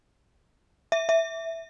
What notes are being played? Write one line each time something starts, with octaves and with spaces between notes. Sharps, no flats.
E5
E5